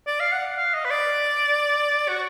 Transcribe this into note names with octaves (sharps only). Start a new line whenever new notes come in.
D5
F5
F#5
F5
D#5
B4
D5
F#4